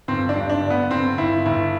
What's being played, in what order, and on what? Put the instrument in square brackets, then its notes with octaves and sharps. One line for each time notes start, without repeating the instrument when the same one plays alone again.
[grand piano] G1 C4
D4
G2
D4
G1
B3
G1 C4
G1 E4
G1 E4